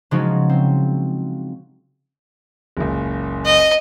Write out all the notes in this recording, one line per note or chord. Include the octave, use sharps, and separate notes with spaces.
C#3 F3 F#3 G#3 D#4 F#4
C4
F#1 C#2
D#5